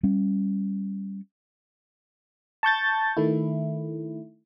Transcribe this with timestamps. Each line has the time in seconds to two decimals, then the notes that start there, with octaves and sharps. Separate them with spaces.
0.03 G3 C#4
2.63 A5 C#6 G6 A6
3.17 D#3 A3 E4